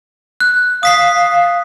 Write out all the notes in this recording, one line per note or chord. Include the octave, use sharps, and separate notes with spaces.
F#6
F5 D#6 B6 C7